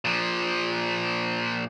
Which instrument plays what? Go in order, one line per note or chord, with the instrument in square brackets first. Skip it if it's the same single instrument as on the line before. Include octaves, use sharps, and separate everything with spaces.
[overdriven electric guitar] A#2 F3